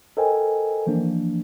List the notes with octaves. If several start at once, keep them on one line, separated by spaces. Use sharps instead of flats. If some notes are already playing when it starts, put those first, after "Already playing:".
A4 A#4 C5 D#5 G5 G#5
E3 F3 A#3 D4